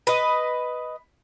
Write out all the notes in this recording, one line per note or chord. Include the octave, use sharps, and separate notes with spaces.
B4 D#5